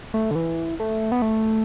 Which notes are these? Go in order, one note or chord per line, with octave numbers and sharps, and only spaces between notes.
A3
D3
E3
A3
B3
A3